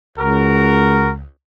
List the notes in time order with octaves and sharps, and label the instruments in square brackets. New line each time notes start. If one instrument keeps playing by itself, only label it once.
[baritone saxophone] C#2 [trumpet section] F#4 A#4